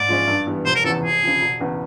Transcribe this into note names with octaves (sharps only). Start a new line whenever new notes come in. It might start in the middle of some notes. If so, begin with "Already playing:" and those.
Already playing: G#2 D5
F3 G#3 C#4
G2
E3 G3 B3
F1 C5
A#4
E2 C#3 E3 A4
F1 G#4
F2 C#3
E1
E2 C#3 E3